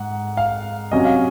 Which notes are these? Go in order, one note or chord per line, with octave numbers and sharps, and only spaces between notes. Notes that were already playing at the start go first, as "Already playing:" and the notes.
Already playing: G#2 F#5
F5
C3 F#3 C#4 D#5
F5